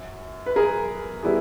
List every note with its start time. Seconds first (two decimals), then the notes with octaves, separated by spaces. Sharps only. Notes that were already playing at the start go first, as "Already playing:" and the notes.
Already playing: F#2
0.46 B4
0.56 G#4 A#4
1.23 G3 B3 E4 G#4